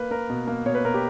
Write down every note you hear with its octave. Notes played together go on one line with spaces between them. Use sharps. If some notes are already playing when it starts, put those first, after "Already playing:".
Already playing: A#3 B4
A#3 A#4
B2
A#3
B2 C#5
B4
B2 A#4
G4